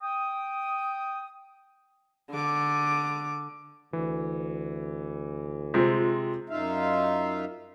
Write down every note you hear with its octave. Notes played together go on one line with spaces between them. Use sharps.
G5 D#6
D3 D6
D2 E3
C3 G#3 C4 F4
F#2 D#4 F4 E5 F5